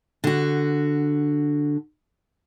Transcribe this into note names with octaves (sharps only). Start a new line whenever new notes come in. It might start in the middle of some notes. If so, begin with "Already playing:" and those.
D3 F#4